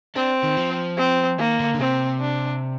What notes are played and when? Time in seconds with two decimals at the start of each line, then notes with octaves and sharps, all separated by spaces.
0.16 C4 D4
0.43 D#3
0.57 F3
0.97 C4
1.38 D#3 A#3
1.59 D3
1.74 D3
1.79 C3 C4
2.20 D4